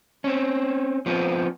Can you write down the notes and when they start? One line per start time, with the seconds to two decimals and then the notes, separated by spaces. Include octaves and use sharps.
0.24 C4 C#4
1.06 F3 B3 C4